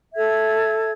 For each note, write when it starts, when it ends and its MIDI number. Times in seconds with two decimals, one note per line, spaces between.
0.15 0.91 69
0.15 0.91 76
0.15 0.91 92